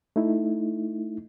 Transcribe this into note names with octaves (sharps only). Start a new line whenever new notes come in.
A3 D#4 E4